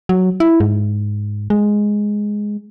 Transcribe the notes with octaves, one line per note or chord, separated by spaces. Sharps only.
F#3
E4
G#2
G#3